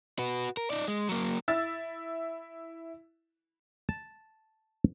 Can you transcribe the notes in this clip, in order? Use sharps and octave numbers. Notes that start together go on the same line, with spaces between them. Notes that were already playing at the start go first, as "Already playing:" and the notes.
F#4 B4
A#4
D#4 D5
G#3
F#3 A#3
E4 E6 A6
A5